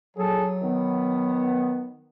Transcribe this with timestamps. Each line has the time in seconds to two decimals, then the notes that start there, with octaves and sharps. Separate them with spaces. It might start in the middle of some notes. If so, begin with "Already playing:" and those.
0.17 A#1 F#3 G#4 A4
0.63 D#3 B3